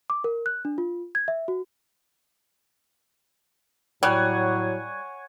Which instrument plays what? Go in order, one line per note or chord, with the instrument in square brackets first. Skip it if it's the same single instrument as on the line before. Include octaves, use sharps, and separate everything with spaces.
[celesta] D6
A#4
F#6
D4
F4
G#6
E5
F#4
[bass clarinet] A2 [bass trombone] F#3 [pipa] G3 [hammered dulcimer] C#5 F#5 G#5